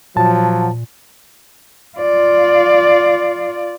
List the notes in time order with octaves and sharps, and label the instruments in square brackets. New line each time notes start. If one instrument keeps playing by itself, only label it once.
[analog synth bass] A#2 [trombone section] F3 F#3 [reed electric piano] A5
[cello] F4 D5